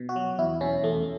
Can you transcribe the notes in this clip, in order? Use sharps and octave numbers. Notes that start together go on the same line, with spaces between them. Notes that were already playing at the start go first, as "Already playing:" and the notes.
Already playing: B2
F#4
F#3
E2 E4
B2 C#4
E2 A3